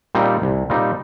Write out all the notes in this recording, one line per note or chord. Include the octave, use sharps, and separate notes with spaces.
A#2 G3 C4 D#4
C2
A#2 G3 C4 D#4